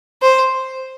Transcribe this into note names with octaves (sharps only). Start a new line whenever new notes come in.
C5